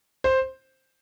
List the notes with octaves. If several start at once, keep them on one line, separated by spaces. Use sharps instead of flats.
C5